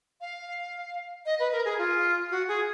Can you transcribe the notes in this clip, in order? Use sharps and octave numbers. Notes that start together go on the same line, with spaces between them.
F5
D#5
B4
A#4
G#4
F4
F#4
G#4